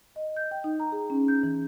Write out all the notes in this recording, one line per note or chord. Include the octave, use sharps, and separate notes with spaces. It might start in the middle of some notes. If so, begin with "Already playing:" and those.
D#5
G6
G5
D#4
A#5
G#4
C#4
G6
E3